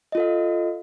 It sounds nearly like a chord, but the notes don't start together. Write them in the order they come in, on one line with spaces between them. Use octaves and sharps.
D#5 F4 A4 F5